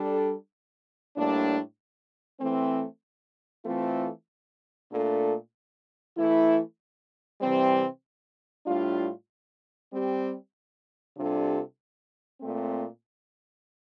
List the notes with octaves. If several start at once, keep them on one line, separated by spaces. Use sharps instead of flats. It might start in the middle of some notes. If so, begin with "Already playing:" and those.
Already playing: G3 D4 A4
A2 G3 A#3 D4
E3 A3 C4
E3 A3 C4 F4 A4
A#2 A3 D4 A4
E3 A3 E4
C3 E3 G3 C4
A2 G3 D4 F4
G3 C4 G4
C3 G3 D4 F4 A4
A#2 A3 C4